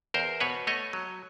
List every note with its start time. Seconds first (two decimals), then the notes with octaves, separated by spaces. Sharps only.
0.14 E2 A#4 C5
0.40 B2 B4 C#5
0.67 A3 C#5 D#5
0.93 F#3